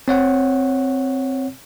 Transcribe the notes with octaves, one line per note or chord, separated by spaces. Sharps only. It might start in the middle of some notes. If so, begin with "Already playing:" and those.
C4 C#5 F#5